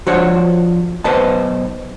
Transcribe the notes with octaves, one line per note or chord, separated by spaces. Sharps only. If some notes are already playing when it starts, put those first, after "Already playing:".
F3 D4 F#4 C5 C#5
B1 B2 B4 C5 D#5 A5